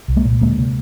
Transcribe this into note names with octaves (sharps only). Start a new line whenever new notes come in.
C2
G#3 A#3
A#2
D2 G#3 A#3
C3